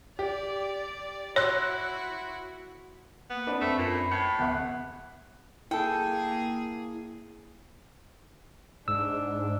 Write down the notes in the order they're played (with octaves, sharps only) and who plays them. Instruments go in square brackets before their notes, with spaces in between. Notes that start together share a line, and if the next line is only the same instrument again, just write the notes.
[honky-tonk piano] G4 [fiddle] D5
[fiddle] E4 F#4 [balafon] C#5 [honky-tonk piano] C6 E6 F#6
[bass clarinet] A#3 [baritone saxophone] B3
[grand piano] C4 D4 B4 [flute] B5
[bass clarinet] F2 [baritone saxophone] A3 [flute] B5
[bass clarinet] F#2 [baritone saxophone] A#2
[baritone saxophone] A2 [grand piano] G#6 C#7
[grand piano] D1 E5 B5 [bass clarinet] B3 [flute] F#6
[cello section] A#3 G#4 [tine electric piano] E4 [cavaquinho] A4 G5
[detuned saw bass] G#2 [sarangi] D4 [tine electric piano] E6